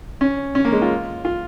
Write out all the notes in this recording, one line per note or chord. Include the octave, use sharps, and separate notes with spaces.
C#4
C#4
A#3
G#3
F4
F4